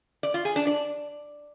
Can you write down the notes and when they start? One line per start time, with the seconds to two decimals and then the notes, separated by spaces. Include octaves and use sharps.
0.23 D5
0.34 F4
0.45 G#4
0.56 D4
0.67 D5